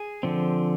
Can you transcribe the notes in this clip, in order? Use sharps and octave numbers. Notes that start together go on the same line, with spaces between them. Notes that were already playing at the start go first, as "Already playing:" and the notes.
Already playing: G#4
D3 F3 C4